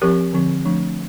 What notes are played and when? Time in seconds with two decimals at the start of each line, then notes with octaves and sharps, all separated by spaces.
0.02 F3 C4 G4 A#4
0.33 D3 F3 C4
0.65 F3 A3 D4